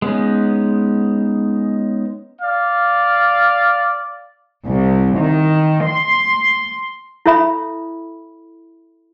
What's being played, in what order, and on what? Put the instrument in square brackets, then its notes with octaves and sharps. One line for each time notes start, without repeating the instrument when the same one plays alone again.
[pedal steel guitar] G#3 B3 C#4 D#4
[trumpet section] D5 F5
[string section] C2
D#3
C6
[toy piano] E4 A4 C#5 E5 B5